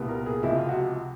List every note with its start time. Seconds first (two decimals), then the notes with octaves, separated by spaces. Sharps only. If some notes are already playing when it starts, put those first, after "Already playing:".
Already playing: C2 A#2 G3 B3
0.08 A#4
0.26 G#4
0.43 C#2 C3 F3 E4
0.56 F4
0.69 F#4